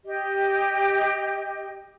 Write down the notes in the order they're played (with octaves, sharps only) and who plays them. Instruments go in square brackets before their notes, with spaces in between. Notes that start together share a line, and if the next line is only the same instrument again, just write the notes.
[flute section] G4 D#5